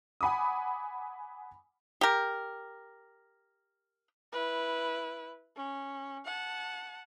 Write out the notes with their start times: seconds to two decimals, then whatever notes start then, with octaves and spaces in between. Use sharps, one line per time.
0.21 F#5 G#5 B5 D6 D#6
2.01 G4 A#4
4.33 E4 B4
5.57 C#4
6.25 F#5 A5